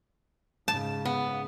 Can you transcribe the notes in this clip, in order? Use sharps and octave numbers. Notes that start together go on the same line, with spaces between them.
G#2 C#3 A5
B3